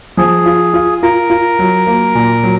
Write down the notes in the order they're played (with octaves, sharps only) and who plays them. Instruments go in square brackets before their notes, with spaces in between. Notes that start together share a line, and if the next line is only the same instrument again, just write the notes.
[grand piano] F3 [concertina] G#4
[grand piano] F4
F4
[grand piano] F4 [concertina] A#4
[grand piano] F4
F#3
A#3
A#2
F#3